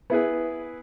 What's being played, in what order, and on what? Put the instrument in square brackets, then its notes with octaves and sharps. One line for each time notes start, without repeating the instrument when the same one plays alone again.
[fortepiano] B3 E4 G#4 B4